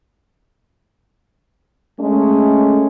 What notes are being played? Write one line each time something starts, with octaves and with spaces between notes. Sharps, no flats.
G#3 A3 C#4